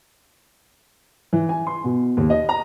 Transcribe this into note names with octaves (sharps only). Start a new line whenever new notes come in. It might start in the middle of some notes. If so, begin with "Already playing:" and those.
E3
G#5
C6
B2
D#2
D#5
A#5